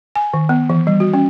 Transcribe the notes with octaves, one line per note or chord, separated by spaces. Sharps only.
G#5
D#3
B3
E3
G3
F#4
C#4